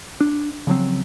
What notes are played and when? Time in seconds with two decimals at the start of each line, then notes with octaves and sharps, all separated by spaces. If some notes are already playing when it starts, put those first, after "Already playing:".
0.21 D4
0.67 C#3 F3 F#3 C4